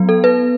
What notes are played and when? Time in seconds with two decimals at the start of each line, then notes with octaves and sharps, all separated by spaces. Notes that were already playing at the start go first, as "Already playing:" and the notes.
Already playing: F#3 B3
0.09 A4
0.24 B4